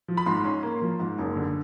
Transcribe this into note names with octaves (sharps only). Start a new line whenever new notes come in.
F3
B5
G#2 C6
C#4 C6
A#3
F3
G#2
F#1
D3